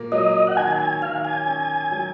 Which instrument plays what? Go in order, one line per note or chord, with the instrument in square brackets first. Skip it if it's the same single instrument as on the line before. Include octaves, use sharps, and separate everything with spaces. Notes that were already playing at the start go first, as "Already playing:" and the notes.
Already playing: [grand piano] A#2 A#3
[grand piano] F#3 [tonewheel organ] D#5
[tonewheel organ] F#5
[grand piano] D#3 [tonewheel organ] G#5
[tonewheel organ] G#5
[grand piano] D#3 [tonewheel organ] F5
[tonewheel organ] G#5
[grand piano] C#4
F#3